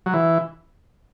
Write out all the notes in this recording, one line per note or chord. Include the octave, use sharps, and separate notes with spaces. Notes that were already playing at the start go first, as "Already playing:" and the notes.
F#3
E3